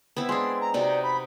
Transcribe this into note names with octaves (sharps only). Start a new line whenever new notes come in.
B3 C4 E4
G#3 D4 C6
A#5
C3 D#4 F#4 D5
B5